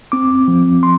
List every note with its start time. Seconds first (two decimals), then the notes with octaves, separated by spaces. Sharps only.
0.12 C4 D6
0.48 F3
0.83 C6